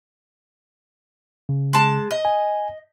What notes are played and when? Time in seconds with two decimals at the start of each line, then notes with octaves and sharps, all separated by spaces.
1.49 C#3
1.73 G#3 A5
2.11 D#5
2.25 G#5